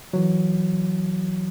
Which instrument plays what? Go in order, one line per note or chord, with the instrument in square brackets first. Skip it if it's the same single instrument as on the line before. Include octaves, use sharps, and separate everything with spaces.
[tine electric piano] E3 F#3